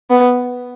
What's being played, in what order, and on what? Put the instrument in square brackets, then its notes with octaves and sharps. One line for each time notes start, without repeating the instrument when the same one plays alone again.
[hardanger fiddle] B3